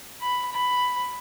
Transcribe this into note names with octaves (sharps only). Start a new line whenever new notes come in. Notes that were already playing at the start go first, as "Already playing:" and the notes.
B5
B5